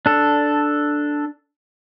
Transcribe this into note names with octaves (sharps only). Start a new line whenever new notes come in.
D4 A4